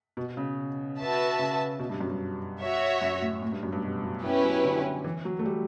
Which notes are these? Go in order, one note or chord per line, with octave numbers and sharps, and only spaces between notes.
B2
C#3
F#4 B4 E5 A5
C#3
B2
G2
F#2
G2
F#4 C#5 E5
F#2
A2
A2
G2
F#2
G2
B2
F#3
B3 C#4 E4 G4 B4
F#3
D3
E3
F#3
A3
G3